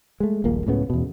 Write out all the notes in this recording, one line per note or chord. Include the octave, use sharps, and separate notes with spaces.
G#3 A3
D#1 A#1 A#2 A#3
C#2 A2 C#3 B3
E2 B2